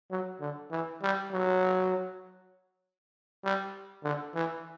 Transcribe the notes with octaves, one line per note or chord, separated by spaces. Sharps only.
F#3
D3
E3
G3
F#3
G3
D3
E3